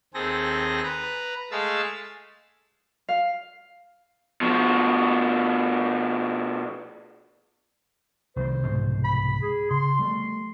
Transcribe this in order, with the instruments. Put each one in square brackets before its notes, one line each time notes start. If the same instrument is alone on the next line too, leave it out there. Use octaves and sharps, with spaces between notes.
[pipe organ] D#2 C4 G#4 A4 A#6
B4 A#5
G#3 A3 F5 A5 E6
[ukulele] F5
[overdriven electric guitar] B2 F3
[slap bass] C2 D#3 G3 [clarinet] C5
[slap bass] C2 G#2 B2
[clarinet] B5
G#4
[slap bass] C#3 [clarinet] C6
[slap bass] G3 A3